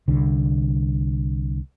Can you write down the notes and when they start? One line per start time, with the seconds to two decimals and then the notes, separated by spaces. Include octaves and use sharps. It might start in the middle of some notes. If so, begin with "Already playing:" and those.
0.08 C2 D3